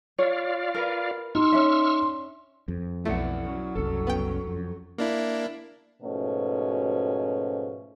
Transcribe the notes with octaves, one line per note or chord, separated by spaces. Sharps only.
F4 C#5 D5 F5
A#4 B4
D#4 C6 C#6 E6 F6
C#4 D4 E5
F2
B1 A3 E4 D5 F#5
F#3 C#4
F#1 C2 A4
B3 G5
F2
A#3 D4 E4
G#2 B2 F3 A3 C#4 F#4